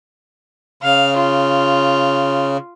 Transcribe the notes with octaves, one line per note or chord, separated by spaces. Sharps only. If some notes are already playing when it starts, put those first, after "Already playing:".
C#3 F5
F4